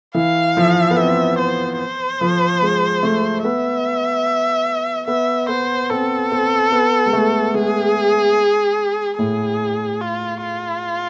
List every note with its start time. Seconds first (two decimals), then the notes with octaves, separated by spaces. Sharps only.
0.15 E3 F5
0.57 F3
0.90 B3
0.97 C4 E5
1.39 C5
1.79 C5
2.21 F3
2.62 G#3
3.03 A3
3.44 B3 E5
5.08 B3 E5
5.49 B3 C5
5.90 C4 A4
6.32 C4
6.72 B3
7.06 G#3
7.13 A3
7.54 G#3 G#4
9.19 A2 G#4
10.01 F4
10.43 F4